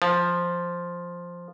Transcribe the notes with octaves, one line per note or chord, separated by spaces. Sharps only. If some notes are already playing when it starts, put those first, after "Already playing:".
F3